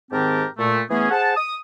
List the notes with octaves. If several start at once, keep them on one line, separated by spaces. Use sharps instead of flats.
G#2 D#3 C4 G4 A#4 A5
A#2 A3
E3 A3 B3 C#4 G#4
G#4 C5 F#5 A5
D#6